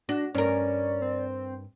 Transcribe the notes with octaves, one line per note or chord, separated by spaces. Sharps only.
D4 F#4
G2 C#4 A#4 D5
C4